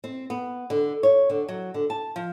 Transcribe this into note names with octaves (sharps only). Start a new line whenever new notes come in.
C4
B3
D3
C#5
D3
F#3
D3
A5
F3